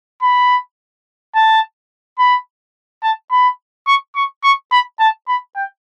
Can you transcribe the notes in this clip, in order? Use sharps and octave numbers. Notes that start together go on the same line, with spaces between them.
B5
A5
B5
A5
B5
C#6
C#6
C#6
B5
A5
B5
G5